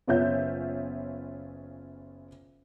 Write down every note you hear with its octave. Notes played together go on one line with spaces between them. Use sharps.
F#1 B3 C#4 F4 E5 G6